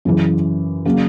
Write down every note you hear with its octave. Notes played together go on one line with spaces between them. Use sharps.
F#2 C#3 E3
C#3 F#3 A#3